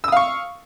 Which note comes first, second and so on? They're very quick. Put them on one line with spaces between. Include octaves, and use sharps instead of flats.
E6 D#6 F5 C#6